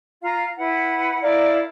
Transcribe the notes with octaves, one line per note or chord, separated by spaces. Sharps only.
F4 F5 A#5
E4 B4 F#5
E4 A#4 D5 F5